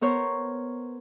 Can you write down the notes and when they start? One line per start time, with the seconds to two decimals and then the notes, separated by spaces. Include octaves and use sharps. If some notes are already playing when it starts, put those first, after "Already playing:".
0.01 B3 A#4 C5 C#5